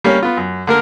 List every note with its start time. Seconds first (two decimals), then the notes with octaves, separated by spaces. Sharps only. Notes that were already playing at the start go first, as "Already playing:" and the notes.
0.04 G3 A#3 C#4
0.23 B3 F4
0.37 F#2
0.67 D3 A#3 A#4